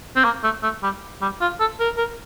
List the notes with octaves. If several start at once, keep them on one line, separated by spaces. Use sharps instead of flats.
C4
A#3
A3
A3
G3
G3
F4
A4
A#4
A#4